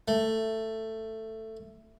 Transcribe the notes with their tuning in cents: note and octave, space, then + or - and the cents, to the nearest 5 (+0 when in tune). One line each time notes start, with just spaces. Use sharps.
A3 +10